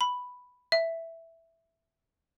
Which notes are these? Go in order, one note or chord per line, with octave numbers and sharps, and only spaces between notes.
B5
E5